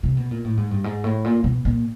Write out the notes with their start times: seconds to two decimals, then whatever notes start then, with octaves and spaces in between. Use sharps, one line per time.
0.03 C3
0.17 B2
0.31 A#2
0.44 A2
0.57 G#2
0.71 G2
0.84 G#2
1.04 A2
1.24 A#2
1.44 B2
1.65 A#2